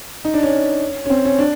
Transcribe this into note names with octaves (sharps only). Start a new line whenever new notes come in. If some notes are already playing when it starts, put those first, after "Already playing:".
D#4
D4
C#4
C#4
C4
C#4
D4